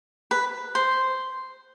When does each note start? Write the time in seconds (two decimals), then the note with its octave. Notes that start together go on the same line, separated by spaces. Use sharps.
0.31 B4
0.75 C5